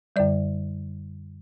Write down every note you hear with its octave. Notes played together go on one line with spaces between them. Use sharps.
F#2 D3 G3 D5